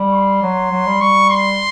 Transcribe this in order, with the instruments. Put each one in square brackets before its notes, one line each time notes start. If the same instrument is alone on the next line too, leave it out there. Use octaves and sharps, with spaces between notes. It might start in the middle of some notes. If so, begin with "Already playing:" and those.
Already playing: [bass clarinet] G3
[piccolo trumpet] C6
[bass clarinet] F#3
F#3
G3
[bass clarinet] G3 [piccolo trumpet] C#6
[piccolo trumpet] C6